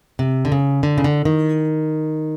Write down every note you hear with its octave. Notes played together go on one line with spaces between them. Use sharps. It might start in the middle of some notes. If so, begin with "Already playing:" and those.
C3
D3
C#3
D3
C#3
D3
D#3